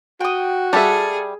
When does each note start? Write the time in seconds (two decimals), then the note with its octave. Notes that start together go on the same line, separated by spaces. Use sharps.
0.20 F#4 G5 D#6
0.73 G3 G#4 A4 E5 F5 A5